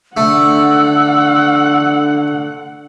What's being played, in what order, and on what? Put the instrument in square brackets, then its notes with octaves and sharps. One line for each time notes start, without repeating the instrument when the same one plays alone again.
[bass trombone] D3 [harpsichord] A3 [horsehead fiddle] F#5 [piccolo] E6